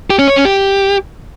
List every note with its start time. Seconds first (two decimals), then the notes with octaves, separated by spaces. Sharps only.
0.10 G4
0.19 C#4
0.28 C#5
0.36 C#4
0.45 G4